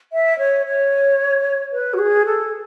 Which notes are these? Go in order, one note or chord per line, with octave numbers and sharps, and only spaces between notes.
E5
C#5
C#5
B4
F#4
G#4
A4